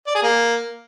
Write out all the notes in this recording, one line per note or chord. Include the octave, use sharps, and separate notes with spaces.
D5
G#4
A#3